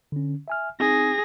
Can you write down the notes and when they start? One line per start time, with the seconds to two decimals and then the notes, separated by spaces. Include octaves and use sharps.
0.12 D3 C#4
0.48 E5 G#5 F6
0.80 C4 D#4 G#4 A#6